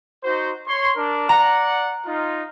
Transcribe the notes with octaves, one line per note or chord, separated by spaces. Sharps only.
D#4 F#4 C5
C#5 C6
D4 A#4
D5 F#5 A#5
D#4 F4